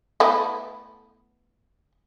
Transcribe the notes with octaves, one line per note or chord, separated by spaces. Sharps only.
A3 B3 E4